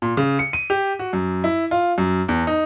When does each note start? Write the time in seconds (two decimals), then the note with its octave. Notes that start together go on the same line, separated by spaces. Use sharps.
0.02 A#2
0.17 C#3
0.39 C#7
0.53 D#7
0.70 G4
0.99 F#4
1.13 F#2
1.44 E4
1.71 F4
1.98 F#2
2.29 E2
2.47 D#4